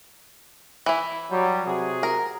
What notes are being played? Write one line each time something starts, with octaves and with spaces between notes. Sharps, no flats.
E3 E4
F#3 G3
C3 F#4 G#4
A#4